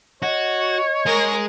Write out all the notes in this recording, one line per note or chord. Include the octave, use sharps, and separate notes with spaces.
F#4 C#5 D#5
G#3 G#4 A#4